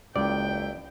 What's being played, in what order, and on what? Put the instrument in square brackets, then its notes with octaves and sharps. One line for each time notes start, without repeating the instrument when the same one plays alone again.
[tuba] F#1 [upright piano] C#2 [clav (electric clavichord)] D5 [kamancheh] G5